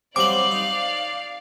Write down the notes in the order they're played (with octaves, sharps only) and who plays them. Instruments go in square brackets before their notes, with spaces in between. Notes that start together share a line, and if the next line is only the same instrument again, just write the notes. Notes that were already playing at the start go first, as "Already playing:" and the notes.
[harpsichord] F#3 G3 C4 [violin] D5 F5 [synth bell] D6 F#7
[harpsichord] D#4